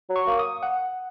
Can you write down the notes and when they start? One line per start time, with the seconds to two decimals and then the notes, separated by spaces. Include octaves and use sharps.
0.10 F#3
0.16 C#6
0.27 A#3
0.39 D#6
0.63 F#5